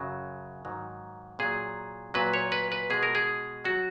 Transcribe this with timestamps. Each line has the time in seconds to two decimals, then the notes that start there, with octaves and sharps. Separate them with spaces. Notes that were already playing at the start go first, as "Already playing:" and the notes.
Already playing: F#2 C#3 F#3
0.65 G#2 D#3 F#3
1.39 A#2 F#3 G#4
2.14 A#2 F#3 B4
2.34 C#5
2.52 B4
2.72 B4
2.90 B2 G#3 G#4
3.03 A#4
3.15 G#4
3.64 F#3 F#4